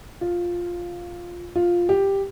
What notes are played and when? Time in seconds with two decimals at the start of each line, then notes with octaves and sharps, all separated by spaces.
0.21 F4
1.56 F4
1.89 G4